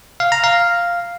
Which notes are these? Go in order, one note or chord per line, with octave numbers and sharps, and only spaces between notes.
F5
A#5
F5